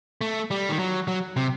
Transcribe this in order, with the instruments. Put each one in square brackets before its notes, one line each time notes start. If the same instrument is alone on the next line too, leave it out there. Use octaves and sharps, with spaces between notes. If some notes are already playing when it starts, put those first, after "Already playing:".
[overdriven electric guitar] A3
G3
D#3
F#3
F#3
C3